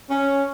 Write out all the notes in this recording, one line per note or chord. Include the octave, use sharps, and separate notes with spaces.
C#4